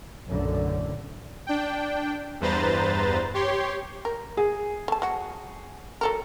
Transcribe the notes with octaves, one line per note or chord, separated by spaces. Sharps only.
F#1 B1 F#2 A2 D3
D4 G5
E2 G2 B4 C5 A#5 A6
G4 C#5 C6
A#4
G#4
A3 A5
F#3 F#4
F#3 A4 A#4